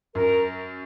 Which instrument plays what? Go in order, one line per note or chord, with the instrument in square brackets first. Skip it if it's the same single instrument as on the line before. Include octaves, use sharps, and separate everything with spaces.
[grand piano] F#2 [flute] A#4